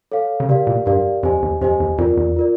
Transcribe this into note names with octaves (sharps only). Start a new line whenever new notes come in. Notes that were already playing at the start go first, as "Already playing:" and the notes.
A4 C#5 F5
C#3
C3 G4 A#4 D5 F5
A#2
G2 G4 A#4 D5 F5
F2 G4 C5 D#5 G#5
E2
F2 G4 C5 D#5 G#5
E2
F2 F4 A#4 D5
E2
F4 A#4 D5